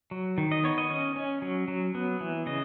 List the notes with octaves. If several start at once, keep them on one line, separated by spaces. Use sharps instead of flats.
F#3
D#3
D#5
B3 C#5
D#5
C#4
C#4
F#3
F#3
B3
E3
C#3 D#5